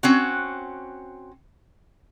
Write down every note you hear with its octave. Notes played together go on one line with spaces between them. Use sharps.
C4 C#4 F#4